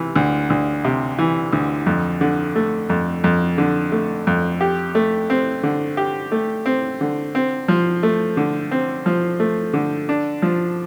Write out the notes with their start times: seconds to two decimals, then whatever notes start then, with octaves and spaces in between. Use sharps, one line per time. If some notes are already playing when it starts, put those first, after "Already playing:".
Already playing: C3 E3
0.16 D2
0.50 D2
0.85 C3
1.19 E3
1.53 D2
1.86 F2
2.21 D3
2.56 A3
2.90 F2
3.24 F2
3.58 D3
3.92 A3
4.27 F2
4.61 G4
4.95 A3
5.30 C4
5.63 D3
5.97 G4
6.32 A3
6.66 C4
7.01 D3
7.35 C4
7.68 F3
8.03 A3
8.37 D3
8.71 C4
9.06 F3
9.40 A3
9.74 D3
10.09 D4
10.42 F3